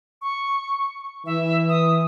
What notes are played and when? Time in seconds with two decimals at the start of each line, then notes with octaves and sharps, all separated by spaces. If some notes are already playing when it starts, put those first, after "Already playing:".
0.22 C#6
1.26 E3 E5
1.69 D#6